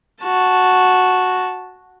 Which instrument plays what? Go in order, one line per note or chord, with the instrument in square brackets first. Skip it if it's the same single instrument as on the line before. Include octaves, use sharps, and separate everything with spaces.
[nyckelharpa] F#4 A5